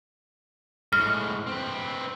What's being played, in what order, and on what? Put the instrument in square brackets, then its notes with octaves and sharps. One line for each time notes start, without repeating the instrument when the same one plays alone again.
[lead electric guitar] A2 G#3 [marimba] F6
[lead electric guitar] C4 B4